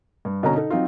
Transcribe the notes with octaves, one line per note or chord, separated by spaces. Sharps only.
G2
B2 D3 C#4 A4 A#5
D#4 A4
F#3 C4 D#4 F4